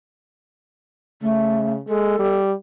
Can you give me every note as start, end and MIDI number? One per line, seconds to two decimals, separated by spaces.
1.22 1.80 49
1.22 1.73 57
1.88 2.16 56
1.88 2.37 69
2.19 2.52 55